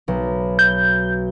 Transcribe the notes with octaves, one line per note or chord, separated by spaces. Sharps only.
B1
G6